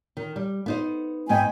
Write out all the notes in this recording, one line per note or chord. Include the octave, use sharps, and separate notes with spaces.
D#3
G3
B3 D#4 C5
G#2 B3 C4 D#4 G5 G#5